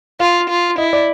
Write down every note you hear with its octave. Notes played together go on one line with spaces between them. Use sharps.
F4 F5
F4
E4 D#5
D5